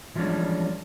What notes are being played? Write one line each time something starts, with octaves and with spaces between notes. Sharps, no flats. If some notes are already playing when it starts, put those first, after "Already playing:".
E3 F3 G3 G#3 C#4 D4